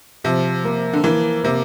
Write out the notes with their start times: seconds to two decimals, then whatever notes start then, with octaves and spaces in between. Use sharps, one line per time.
0.24 C3 F3
0.64 A#3
0.93 D3
1.04 E3 A#3
1.44 C3 A#3